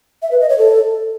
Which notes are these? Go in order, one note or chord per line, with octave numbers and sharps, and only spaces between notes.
E5
B4
D#5
C#5
A4